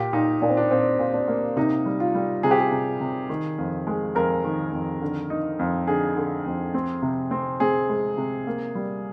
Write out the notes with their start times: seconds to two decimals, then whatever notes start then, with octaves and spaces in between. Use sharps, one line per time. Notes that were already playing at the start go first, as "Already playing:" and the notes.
Already playing: A#2 G4
0.13 A#2 D#4
0.42 A#2 D4
0.49 C4
0.57 D4
0.70 A#2 C4
0.99 A#2
1.14 D4
1.28 A#3
1.57 C3 D#4
1.86 G3
2.00 F4
2.15 G3
2.43 C3 G#4
2.51 G4
2.59 G#4
2.71 C3
3.01 C3
3.29 D#3
3.58 F2
3.87 G#3
4.15 F2 A#4
4.44 D#3
4.72 F2
5.02 D3
5.30 D#4
5.59 F2
5.87 D3 G#4
6.17 D3
6.46 F2
6.74 C4
7.02 C3
7.31 C4
7.60 C4 G#4
7.89 G#3
8.17 C3
8.47 A#3
8.75 G3